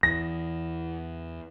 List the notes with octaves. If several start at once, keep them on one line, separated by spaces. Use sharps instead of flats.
E2 E3 A#6